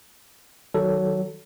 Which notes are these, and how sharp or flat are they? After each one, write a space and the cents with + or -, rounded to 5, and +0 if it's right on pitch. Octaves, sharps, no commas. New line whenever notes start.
D#3 +0 F#3 +15 A4 +0